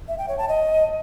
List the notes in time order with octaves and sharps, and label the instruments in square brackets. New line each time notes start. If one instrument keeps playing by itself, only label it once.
[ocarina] E5
G5
C#5
A5
D#5